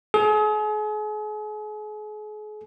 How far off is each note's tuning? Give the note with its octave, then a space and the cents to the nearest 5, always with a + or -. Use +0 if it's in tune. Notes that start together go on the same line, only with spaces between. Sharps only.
G#4 +40